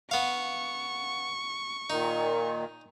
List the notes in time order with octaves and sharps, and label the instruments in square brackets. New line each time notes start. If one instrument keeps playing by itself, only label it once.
[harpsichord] B3 F5 [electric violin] C#6
[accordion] A#2 D#3 [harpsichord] D#4